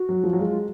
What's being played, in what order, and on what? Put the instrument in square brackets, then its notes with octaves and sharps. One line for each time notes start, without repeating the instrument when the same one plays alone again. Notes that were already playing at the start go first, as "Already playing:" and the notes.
Already playing: [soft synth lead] F#4
[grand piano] F#3
F3
F#3
[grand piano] G#3 [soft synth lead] F4